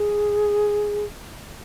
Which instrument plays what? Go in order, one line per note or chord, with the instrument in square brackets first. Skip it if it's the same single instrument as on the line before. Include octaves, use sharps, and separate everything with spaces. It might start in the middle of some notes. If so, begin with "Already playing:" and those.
Already playing: [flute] G#4